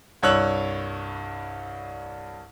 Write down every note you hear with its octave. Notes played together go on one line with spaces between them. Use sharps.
C2 G2 C#5 E6 F#6 F#7